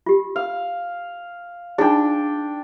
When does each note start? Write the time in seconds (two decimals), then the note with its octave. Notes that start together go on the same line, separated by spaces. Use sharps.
0.06 F4 G4
0.36 F5
1.78 D4 D#4 F4 G#4 G5